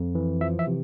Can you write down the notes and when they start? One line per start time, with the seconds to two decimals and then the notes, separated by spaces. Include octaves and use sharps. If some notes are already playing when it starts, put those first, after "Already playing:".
Already playing: F2
0.15 E3
0.41 F3 E5
0.59 E5
0.67 C3